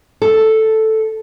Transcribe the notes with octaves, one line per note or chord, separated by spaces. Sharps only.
A4